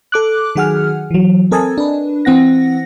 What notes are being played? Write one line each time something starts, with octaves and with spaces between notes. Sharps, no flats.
A4 D6 F#6
D#3 F#3 G#4 F#5 G#5 F6
E3 F#3
C4 A4 A#4 D#5 G#5 A5
D4 B4
E3 C4 F#5 A#6